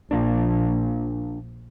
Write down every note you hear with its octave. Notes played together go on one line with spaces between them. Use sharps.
A#1 F3 A#3 D4